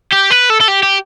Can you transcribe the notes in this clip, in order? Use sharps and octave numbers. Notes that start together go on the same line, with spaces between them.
G4
B4
A4
A4
G4
G4